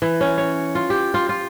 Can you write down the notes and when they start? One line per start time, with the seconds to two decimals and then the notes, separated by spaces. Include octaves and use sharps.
0.02 E3
0.21 C#4
0.38 C#5
0.75 F4
0.90 G4
1.14 F4
1.29 F4